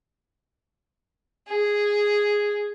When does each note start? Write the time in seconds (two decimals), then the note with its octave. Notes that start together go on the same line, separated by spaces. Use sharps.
1.48 G#4